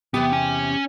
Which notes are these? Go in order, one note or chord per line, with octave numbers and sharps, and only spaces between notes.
E2 C3 B3 G4
C#4 G#5